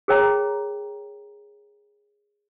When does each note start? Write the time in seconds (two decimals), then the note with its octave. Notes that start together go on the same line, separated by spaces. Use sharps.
0.08 G#4 A#4 C#5 G5 A#5